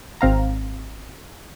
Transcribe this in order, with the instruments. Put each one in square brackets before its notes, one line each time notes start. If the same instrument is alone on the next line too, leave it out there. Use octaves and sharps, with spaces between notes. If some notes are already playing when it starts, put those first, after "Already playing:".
[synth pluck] G#1 C4 F5 A#5